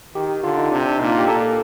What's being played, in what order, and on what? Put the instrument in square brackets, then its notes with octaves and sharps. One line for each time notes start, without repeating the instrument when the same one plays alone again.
[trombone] D#3 [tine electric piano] G4
[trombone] D3 [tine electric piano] F4
[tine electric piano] D#4
[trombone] C3 [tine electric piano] D4
[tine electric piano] D4
[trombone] A#2 [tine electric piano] D#4
[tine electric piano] F4
G4
[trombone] A#2 [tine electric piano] A4